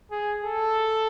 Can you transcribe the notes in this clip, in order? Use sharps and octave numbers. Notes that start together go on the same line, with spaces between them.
G#4
A4